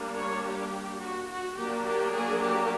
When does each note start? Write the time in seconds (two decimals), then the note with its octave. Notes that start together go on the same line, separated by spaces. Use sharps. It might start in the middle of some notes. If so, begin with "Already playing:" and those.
Already playing: G3 A#3 D4
0.17 C#5
0.46 G4
1.02 F#4
1.30 F#4
1.58 F#3 A#3 D4 G4
1.86 G4
2.14 G#4
2.43 G4